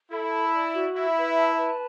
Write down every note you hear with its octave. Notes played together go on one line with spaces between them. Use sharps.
E4 A4
A5
D5
F#4
E4 E5
B4
A5
B4